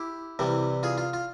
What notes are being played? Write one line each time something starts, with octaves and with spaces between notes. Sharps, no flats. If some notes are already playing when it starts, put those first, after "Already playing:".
Already playing: E4 G4
C2 C3 E3 G3
F4 G#4
F4
F4